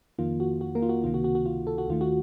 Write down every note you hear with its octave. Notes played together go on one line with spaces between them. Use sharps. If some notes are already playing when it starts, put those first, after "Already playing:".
F2 D#3 A#3 F4
F#4
F#4
A#3 A#4
F4
F#4
C#2 C3 D#3 A#3 F4
F#4
F#4
F#4
F4
A4
F#4
D#2 D#3 A3 F4
F#4